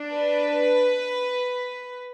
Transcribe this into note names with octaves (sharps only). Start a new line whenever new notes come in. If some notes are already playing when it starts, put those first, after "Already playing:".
Already playing: D4
B4